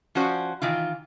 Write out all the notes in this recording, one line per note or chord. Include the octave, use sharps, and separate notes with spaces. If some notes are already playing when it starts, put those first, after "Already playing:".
F3 C#4 F#4 C5 D5
D#3 E3 F4